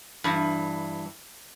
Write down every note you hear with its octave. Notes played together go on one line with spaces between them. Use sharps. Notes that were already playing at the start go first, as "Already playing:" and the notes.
G2 E3